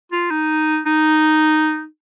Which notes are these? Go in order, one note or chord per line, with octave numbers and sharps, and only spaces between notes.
F4
D#4
D#4